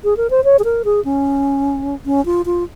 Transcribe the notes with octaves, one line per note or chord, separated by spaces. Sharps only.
G#4
A#4
C5
C#5
G#4
A#4
G#4
C#4
C#4
F4
F4